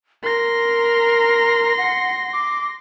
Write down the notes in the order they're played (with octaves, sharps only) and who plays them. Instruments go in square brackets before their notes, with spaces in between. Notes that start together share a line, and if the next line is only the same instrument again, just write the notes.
[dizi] A#4 [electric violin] C6 A#6
[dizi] F#5
D6